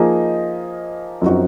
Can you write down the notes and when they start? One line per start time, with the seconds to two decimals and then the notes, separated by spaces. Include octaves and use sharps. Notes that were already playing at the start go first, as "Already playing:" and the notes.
Already playing: F3 A#3 D#4 G#4 D#5
1.22 F#2 F3 C4 D#4 F#4